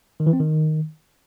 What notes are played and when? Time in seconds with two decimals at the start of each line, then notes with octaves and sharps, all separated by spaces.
0.20 D#3
0.26 E3
0.33 C4
0.40 D#3